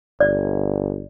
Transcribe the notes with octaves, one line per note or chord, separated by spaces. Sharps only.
G1 D5